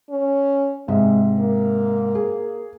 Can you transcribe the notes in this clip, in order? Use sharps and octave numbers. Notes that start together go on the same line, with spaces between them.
C#4
G#2 C3 G#3 E5
A#3
G#4